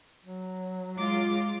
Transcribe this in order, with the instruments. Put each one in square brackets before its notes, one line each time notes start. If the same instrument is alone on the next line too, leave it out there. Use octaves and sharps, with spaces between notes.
[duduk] F#3
[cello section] G#3 F4 [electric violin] D6